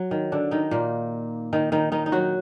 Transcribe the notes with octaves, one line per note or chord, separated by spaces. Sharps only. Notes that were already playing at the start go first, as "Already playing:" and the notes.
Already playing: F#3
D#3
D3 D4
D#3 D#4
A#2 A#3
D#3 D#4
D#3 D#4
D#3 D#4
D#4
F#3 F#4